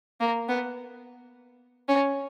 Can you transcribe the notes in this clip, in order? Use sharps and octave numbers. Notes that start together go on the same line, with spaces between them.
A#3
B3
C#4